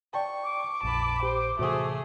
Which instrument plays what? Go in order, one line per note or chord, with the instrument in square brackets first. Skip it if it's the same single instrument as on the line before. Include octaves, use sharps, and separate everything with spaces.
[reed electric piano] D5 G5 A5 [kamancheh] C#6
[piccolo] D6
[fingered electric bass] A#1 [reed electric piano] F2 [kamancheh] A5 B5
[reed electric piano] G4 B5 [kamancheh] C5
[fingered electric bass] A2 C3 E3 [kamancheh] A3 G#4 [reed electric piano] F#4 C5 D#6